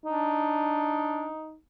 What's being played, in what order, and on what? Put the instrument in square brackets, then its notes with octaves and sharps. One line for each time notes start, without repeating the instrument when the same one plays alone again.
[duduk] D4 [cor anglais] D#4